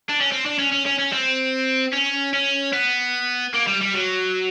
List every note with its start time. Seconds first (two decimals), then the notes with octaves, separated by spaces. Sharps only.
0.09 D4
0.21 C#4
0.32 C4
0.46 D4
0.59 C#4
0.72 C#4
0.86 C#4
0.99 C#4
1.13 C4
1.93 C#4
2.33 C#4
2.73 B3
3.54 A#3
3.67 G3
3.81 G3
3.94 F#3